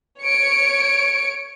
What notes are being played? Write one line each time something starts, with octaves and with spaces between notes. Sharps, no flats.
C#5 C#7 D7